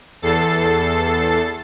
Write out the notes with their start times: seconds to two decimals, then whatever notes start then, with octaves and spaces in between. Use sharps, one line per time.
0.22 E2 A4 A6 C7